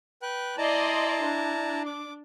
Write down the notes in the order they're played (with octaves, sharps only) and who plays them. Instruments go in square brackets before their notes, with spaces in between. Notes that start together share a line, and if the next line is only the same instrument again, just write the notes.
[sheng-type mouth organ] B4 G5 F#6
[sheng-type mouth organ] E4 A5 A#5 [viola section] D5 D#5 C6
[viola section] D4
[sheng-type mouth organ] D6